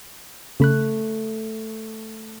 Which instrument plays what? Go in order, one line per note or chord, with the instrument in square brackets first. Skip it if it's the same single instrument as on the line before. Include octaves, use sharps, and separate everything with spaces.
[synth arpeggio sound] C#3 B5 F#6 [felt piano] A3